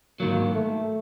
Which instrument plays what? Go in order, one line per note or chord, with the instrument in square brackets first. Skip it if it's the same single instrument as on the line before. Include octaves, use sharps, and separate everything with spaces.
[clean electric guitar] G#2 D#3 F#3 [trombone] A#3
[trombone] A3